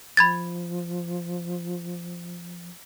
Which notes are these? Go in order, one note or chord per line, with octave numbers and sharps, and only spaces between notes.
F3 B5 G#6 A6